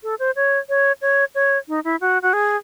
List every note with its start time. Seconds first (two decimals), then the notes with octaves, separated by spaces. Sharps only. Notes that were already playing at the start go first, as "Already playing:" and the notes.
0.03 A4
0.19 C5
0.36 C#5
0.69 C#5
1.02 C#5
1.35 C#5
1.68 D#4
1.84 E4
2.01 F#4
2.22 F#4
2.33 G#4